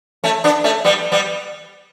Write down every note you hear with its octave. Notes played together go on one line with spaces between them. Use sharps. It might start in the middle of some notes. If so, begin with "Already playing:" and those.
A3 C#4
B3 D4
A3 C#4
G3 B3
G3 B3